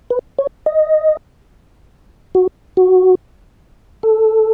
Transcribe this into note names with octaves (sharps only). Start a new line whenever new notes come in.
B4
C#5
D#5
F#4
F#4
A4